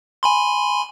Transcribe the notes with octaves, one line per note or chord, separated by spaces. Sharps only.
G#5 B5 C6